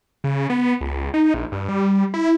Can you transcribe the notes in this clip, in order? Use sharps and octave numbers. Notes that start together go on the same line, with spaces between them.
C#3
B3
C#2
D#4
A#1
G2
G3
E4